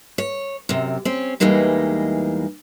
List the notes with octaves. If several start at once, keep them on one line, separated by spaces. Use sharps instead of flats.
C#5
F#2 C3
C4 C#4
E2 E3 G3 G#3 A#3 D#4